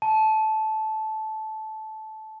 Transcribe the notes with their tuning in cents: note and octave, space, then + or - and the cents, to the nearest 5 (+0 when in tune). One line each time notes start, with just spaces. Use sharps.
A5 -15